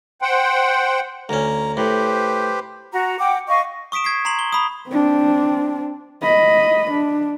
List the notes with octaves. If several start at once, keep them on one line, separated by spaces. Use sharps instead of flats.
C5 F#5 G5
D2 C#4 A#5
A2 G4 B4 C5
F#4 A#5
F#5 G5 D6
D#5 F5 C#6
C#6 D#6 B6 D7 E7
G#6 B6 C7
A#5 C6 C7 E7 F#7
G7
B5 D#6
C4 D4
D#5 B5
D4